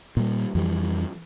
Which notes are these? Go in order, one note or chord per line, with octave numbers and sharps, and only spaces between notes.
A#2 G3
F2 E3 G3